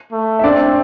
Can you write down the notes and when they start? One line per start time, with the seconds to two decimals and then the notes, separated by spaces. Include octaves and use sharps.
0.12 A3
0.39 E5
0.44 C4 D4 D5